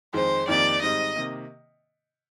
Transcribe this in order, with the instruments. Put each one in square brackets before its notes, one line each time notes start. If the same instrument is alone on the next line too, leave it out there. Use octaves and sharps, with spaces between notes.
[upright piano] F2 D#3 G#3 [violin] C5
[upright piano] F2 D#3 A#3 D#4 G4 [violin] D5
[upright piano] G#2 D#3 G3 C4 D#4 [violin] D#5
[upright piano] C3 D#3 A#3